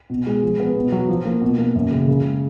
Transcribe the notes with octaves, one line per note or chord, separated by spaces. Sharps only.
B2
G#3
F3
B3
B2
F#3
F3
A#3
B2
A#3
F#2
C#3
C#3
G#3